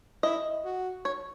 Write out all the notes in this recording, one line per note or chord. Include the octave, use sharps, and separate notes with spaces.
E4 D#5
F#4
C#5